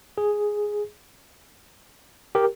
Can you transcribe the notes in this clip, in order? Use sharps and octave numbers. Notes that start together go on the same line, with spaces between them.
G#4
G4 A#4